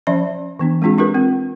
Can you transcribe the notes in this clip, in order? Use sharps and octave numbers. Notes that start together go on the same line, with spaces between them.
F3 C#4 D5 E5 B5
E3 B3 D4
G#3 C4 D4 F4 G#4
D4 F4 G4 A#4 B4
C4